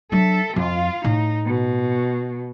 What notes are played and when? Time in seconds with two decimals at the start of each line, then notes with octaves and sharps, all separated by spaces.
0.12 F#3 D4 A4 E5
0.56 F2 F4 F5
1.04 A2 D#4
1.46 B2